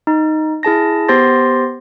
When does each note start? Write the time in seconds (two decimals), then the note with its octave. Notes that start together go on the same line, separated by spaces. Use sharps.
0.07 D#4
0.63 E4 G#4 A5 A#6
1.08 B3 G4 C5 C6 A6 A#6